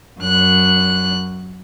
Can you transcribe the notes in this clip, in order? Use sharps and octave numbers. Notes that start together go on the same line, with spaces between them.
F#2 F#6